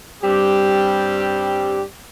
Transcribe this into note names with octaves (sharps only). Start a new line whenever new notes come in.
G2 G3 C4 G4